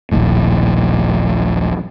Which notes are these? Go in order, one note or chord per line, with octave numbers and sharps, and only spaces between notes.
D#1 A#1 D#2 A2